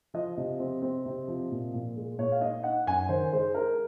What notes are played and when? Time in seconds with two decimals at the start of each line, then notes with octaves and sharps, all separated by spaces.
0.14 F3 D#5
0.37 C3
0.59 C4
0.82 C4
1.06 C3
1.28 F3
1.51 A#2
1.74 A#2
1.96 G#3
2.18 A#2 C#5
2.32 F5
2.41 D#4 D#5
2.63 D#4 F#5
2.86 F#2 G#5
3.09 D#3 C5
3.32 G#3 C5
3.54 G#3 A#4